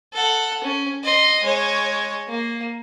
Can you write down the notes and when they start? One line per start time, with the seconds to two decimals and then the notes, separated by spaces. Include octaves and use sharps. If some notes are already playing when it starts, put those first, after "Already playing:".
0.13 A4 F#5
0.63 C#4
1.03 D#5 C6
1.43 G#3 C#5
2.28 A#3